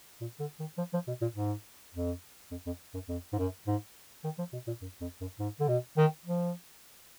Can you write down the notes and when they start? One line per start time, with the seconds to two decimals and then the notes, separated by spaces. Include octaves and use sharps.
0.21 A#2
0.40 D3
0.59 D#3
0.78 F3
0.93 F3
1.08 B2
1.21 A#2
1.35 G#2
1.94 F2
2.51 F2
2.66 F2
2.94 F#2
3.08 F2
3.33 G#2
3.38 F#2
3.67 G#2
4.24 D#3
4.38 F3
4.53 B2
4.67 A#2
4.82 F#2
5.01 F2
5.21 F#2
5.39 G#2
5.60 D3
5.68 B2
5.97 D#3
6.26 F3